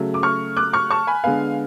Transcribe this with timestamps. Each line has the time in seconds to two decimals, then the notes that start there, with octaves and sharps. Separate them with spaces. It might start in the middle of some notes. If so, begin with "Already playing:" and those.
Already playing: C#3 F#3 A3
0.14 D6
0.23 C#6 F6
0.57 D6 F#6
0.73 C#6 F6
0.90 A5 C#6
1.07 G#5 B5
1.24 D3 G#3 B3 F5 G#5